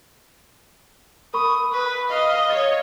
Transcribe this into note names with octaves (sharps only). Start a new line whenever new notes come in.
A#4 B5 C#6 D#6
B4
D#5 F5
C#5 A6